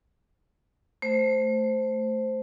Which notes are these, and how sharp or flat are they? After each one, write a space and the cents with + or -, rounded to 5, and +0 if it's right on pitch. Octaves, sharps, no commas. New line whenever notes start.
A3 +0 C5 +0